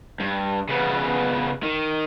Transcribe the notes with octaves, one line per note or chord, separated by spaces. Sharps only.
G2
C#3 B3
D#3